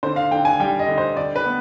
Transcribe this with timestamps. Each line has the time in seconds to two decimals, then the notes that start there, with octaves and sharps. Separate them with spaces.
0.03 D3 C5
0.16 F5
0.31 D3 G5
0.45 G#5
0.60 G3 G5
0.79 D#5
0.88 D3
0.98 C5
1.17 D3 D5
1.36 B4
1.46 B3